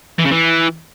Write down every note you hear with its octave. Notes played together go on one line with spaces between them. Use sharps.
E3
C#3
E3